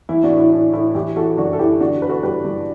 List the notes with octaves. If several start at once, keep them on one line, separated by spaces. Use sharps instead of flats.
E3 E4
D4 F#4
A2
E4
A2 D4
A2 E4
E3 E4 G4
E3 F#4 A4
F#2 D4 F#4
A4
E3 E4 G4
D3 D4 F#4
D3 B4
F#4 A4
G2 G4 B4
G2